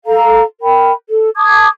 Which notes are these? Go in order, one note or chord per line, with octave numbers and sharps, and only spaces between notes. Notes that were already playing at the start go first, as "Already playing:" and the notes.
A4 F5 A#5
A#4 G5 B5
A4
A5 D6 D#6 G#6